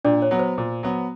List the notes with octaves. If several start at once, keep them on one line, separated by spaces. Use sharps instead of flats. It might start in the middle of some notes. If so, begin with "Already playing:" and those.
A#2 D4 D5
C#5
F#3 B3
C5
A#2
F#3 B3